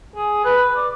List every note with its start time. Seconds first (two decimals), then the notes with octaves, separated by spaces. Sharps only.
0.16 G#4
0.45 B4
0.76 D5